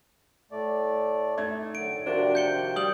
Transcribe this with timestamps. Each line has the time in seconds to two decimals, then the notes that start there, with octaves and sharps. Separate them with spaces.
0.51 A2 A3 D5
1.38 A3 D#4 G#6
1.75 F#2 A2 D3 D7
2.06 C3 D#3 F3 D4 F#4 A#4 C5
2.35 G6 C#7 G7
2.76 G3 D#6 G6 F#7